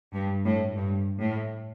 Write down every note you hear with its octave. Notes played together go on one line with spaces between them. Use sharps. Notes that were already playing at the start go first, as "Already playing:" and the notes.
G2
A2
G2
A2